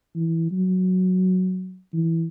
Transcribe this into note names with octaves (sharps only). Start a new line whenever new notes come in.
E3
F#3
E3